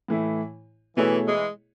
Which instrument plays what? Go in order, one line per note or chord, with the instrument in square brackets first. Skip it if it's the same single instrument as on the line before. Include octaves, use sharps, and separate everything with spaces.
[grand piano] A2 E3 A3 E4
[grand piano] B2 A3 E4 G#4 C#5 [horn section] E3
[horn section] E3 G#3